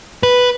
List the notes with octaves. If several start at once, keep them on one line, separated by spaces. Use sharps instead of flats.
B4